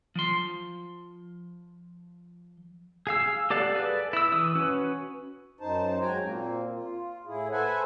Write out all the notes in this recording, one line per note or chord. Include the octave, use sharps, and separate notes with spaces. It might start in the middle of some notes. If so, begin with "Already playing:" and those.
F3 C6
G#4 F5 E6
G4 A4 D5 F5 F#5
G#4 A4 B4 D5
E4 E6
E3 D#6 E6
C#4 F#4 B4
F#2 D#4 C5 A5
G#2 F#3 F#4 G5 G#5 A#5
A#2 A#3 C4
F4
A2 E4 G#4
A4 B4 C5 E5 F#5 G#5